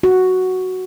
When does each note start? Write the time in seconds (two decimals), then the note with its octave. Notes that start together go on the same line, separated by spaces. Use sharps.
0.03 F#4